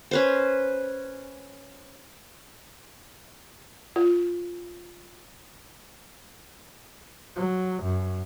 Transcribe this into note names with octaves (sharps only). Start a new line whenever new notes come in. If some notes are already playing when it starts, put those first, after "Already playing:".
C#4 B4 C5
F4
F#3
F#2